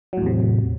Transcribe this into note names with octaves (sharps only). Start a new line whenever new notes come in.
E2 A2 C3 F#3